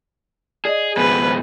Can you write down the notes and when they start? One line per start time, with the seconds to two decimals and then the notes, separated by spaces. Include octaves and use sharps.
0.65 G#4 D5 D#5
0.97 F2 B2 G#4 B4 G#5